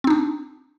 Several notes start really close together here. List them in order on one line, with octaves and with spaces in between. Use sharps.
C4 D#4 D4